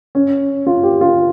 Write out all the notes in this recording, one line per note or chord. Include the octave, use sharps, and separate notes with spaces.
C#4
F4
G4
F4